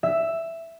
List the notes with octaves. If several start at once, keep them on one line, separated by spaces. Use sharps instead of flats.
E5